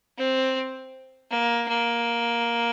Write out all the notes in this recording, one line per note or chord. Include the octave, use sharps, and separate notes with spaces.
C4
A#3
A#3